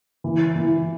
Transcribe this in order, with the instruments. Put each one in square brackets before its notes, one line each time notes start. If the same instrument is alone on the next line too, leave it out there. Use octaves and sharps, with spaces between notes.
[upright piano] E3
E3